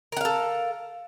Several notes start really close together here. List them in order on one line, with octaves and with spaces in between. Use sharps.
A#4 F#5 F5 A4